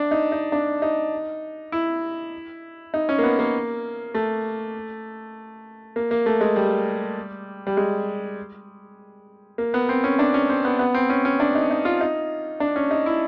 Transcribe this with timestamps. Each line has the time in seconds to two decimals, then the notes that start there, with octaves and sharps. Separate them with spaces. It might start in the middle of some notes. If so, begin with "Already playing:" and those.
Already playing: D4
0.11 D#4
0.32 D#4
0.52 D4
0.82 D#4
1.72 E4
2.94 D#4
3.09 C#4
3.19 A#3
3.23 B3
3.39 A#3
4.14 A3
5.96 A#3
6.11 A#3
6.26 A3
6.41 G#3
6.56 G3
7.67 G3
7.77 G#3
9.58 A#3
9.74 B3
9.89 C4
10.04 C#4
10.19 D4
10.34 C#4
10.50 C4
10.65 B3
10.79 B3
10.94 C4
11.10 C#4
11.25 C#4
11.40 D4
11.55 D#4
11.71 D#4
11.85 F4
12.01 D#4
12.60 D4
12.76 C#4
12.91 D#4
13.06 E4